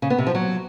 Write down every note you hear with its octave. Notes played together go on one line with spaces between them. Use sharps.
C#3
B3
C3
F3
F#3